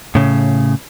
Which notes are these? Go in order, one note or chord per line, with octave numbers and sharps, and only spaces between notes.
A2 C#3